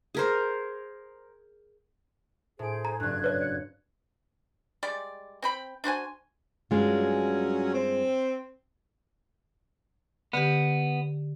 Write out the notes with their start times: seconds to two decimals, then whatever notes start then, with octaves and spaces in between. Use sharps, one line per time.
0.15 G#4 A#4 C5
2.59 A2 G#4 C5 D7
2.85 A#5
3.00 F#1 G2 D5 F#6 G#6
3.24 B4 C#5
3.41 C#7
4.83 G3 G#3 D5
5.42 C4 G5 B5
5.84 D4 F#4 C5 G#5
6.71 G2 F#3 G#3 C#4 F4
7.73 C4
10.33 D3 B3 G4